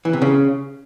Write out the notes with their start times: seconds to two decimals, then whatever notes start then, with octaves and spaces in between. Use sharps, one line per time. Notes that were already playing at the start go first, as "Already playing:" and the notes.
0.05 E3
0.13 C3
0.22 C#3